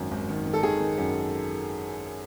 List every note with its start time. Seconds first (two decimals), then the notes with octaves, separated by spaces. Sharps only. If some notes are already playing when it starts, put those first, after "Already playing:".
Already playing: G#1 F#2 D#3
0.11 G#1
0.29 D#3
0.46 D#3
0.53 A4
0.63 D#3 G#4
0.80 D#3
0.98 F#2